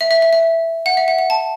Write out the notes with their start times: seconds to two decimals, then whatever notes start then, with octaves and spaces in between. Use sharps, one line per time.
0.01 E5
0.11 E5
0.22 E5
0.33 E5
0.86 F#5
0.97 E5
1.08 F#5
1.19 F#5
1.30 A5